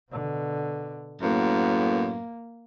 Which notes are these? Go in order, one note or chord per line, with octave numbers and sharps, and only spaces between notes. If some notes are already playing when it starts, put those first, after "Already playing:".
B2 D3
F#2 A2 A#3 B3